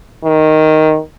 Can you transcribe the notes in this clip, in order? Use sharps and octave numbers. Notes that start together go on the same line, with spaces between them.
D#3